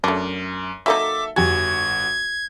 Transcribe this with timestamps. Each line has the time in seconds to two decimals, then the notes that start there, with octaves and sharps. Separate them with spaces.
0.04 F#2 A3 D4
0.86 F#3 A#3 D#4 A4 E5 D6
1.36 G1 F2 F#4 G4 G#5 G#6